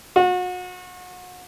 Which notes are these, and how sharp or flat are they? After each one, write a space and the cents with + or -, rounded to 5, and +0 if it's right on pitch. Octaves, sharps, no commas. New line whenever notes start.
F#4 -35